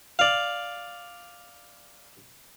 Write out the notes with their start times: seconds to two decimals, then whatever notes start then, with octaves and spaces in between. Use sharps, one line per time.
0.19 D5 F5